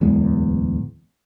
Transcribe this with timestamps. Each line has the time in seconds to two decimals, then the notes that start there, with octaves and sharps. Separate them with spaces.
0.01 D1 E2 G#3